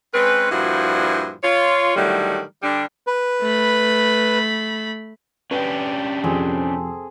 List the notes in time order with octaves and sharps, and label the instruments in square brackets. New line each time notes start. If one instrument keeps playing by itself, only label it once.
[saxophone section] G#3 C4 C#4 B4
G2 A#2 F3 E4 F#4
F4 C#5
A2 D3 D#3 F#3 G3 A3
D3 G3 D4
[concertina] B4
[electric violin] A3 B5
[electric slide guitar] C#4 D4 G4 [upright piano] B4
[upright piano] F2 C3 [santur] C4 G#4 A4